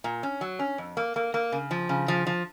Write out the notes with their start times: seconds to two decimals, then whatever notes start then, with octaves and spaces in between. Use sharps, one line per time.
0.04 A#2
0.23 C#4
0.41 F#3
0.59 C#4
0.78 F2
0.97 A#3
1.16 A#3
1.34 A#3
1.52 C#3
1.71 F3
1.89 C#3
2.08 F3
2.27 F3